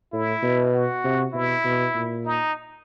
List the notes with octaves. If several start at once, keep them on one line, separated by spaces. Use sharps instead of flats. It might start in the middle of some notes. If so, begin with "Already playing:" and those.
A2 E4
B2
F#4
C3
B2 E4
B2
A#2
D#4